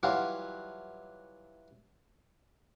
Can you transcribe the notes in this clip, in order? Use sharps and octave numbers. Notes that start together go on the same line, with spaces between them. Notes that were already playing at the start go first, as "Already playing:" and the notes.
E3 F#3 G3 F4 F#4